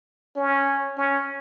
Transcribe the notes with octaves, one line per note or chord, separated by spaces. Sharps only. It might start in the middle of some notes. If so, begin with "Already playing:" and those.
C#4
C#4